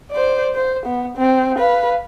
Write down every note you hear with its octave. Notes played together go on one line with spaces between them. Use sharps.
C5 D5
C5
B3
C4
B4 F5